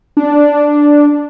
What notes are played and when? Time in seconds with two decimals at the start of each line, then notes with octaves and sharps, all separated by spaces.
0.17 D4